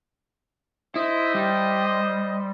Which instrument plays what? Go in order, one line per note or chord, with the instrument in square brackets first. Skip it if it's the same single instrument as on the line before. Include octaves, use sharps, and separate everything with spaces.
[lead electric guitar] E4 [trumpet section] C5 D#5
[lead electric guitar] G3